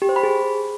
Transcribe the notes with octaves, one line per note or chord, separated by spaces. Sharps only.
G4
C5
B5
G#4